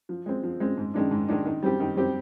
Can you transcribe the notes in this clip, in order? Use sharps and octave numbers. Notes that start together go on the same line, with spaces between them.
F3
G#3 C4
F3
G#3 C4
G#2
D#3 G#3 D4
G#2
D#3 G#3 D4
D#3
G3 C4 G4
D#3
G3 C4 G4